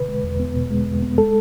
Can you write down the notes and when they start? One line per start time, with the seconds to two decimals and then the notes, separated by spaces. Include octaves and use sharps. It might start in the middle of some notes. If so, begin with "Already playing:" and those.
Already playing: B2 D3 B4
0.08 G#3
0.24 E2
0.40 B3
0.55 B2
0.71 G#3
0.87 E2
1.02 B3
1.18 G#3 A4